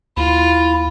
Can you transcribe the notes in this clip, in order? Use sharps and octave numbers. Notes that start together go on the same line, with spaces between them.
D#2 E4 F4